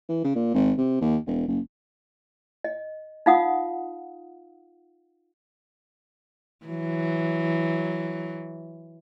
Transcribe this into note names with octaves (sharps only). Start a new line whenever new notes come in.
E3
C#3
A#2
G#1
C3
D#2
E1
F#1
D#5
D#4 F4 F5 F#5 D#6
E3 F#3